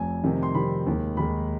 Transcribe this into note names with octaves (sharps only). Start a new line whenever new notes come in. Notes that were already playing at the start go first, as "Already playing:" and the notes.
Already playing: F1 F2 G#5
F2 C3 D#3 G3
C6
F2 C3 D#3 G3 B5
D#2 D#3 G#3
D#2 D#3 G#3 B5